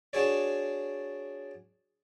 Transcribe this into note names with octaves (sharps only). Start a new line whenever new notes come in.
D4 F#4 G#4 C#5 D5